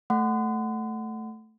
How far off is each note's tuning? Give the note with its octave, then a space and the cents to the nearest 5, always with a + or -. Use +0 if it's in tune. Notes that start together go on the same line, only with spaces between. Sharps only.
A3 +0 F#5 +0 C6 -40